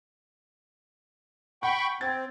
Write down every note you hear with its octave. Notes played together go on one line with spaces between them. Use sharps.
F#5 G5 B5 C#6
C4 G#6 A6